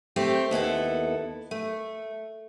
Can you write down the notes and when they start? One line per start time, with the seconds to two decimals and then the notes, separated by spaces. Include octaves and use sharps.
0.16 A3 C4 G4
0.51 D#2 B3 E4 A4
1.51 A3